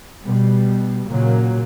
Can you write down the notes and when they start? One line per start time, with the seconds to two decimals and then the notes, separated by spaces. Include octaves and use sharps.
0.24 B2 G3
1.10 A#2 C#3 F#3 A#3